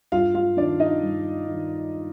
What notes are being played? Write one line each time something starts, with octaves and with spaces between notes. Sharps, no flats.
G2 F4 F5
F4 F5
D#3 D4 D5
D#4 D#5
G2
D#3